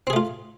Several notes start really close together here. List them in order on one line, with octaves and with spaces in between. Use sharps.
C4 G#4 A3 F4